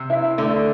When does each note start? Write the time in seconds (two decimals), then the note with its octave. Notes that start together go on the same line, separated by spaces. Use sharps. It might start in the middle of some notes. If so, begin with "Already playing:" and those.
Already playing: C3
0.10 E4
0.38 D3 A3